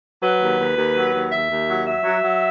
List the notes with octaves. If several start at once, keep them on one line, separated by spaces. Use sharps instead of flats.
F#3 B4
D#2
D#2
D#2
F#3
D#2
D#2 E5
D#2
F#3
F#3 E5
F#3
F#3